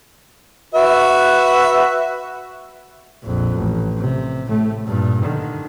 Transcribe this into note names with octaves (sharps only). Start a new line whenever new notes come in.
F#4 B4 E5
A#1 F2
A1
C3
A2 A3
G2 A#2
D3 D#3